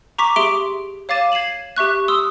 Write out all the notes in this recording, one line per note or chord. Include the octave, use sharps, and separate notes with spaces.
A#5 C#6 D6 B6
G4 G#4 E5 C6 D6 D7
C#5 F5 D6 A6 D#7 E7
G#6 C7 D#7 E7 F#7
G4 E5 C#6 F#6
C6 D#6 E6